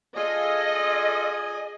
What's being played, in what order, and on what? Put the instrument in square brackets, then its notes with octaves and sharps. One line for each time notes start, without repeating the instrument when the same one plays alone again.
[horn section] F4 A4 [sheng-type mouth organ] G#4 G#5 [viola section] D#5